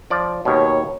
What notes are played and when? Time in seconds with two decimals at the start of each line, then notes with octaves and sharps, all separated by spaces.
0.10 F3 D5
0.45 D#2 B2 C#5